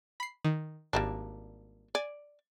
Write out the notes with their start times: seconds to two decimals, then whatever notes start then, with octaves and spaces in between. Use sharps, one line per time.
0.20 B5 C7
0.44 D#3
0.93 G#1 G3 A#3 D4
1.95 D5 G#5